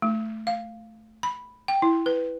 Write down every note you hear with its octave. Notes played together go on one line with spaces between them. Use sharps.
A3
F5
B5
G5
E4
B4